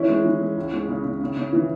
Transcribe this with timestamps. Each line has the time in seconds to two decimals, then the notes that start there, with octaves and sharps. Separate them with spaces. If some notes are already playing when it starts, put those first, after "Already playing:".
Already playing: E3 C#4 E4
0.09 G#3
0.24 E3
0.40 G#3
0.57 C#2
0.73 G#3
0.88 C#3
1.05 C#3
1.21 C#3
1.37 C#3
1.53 E3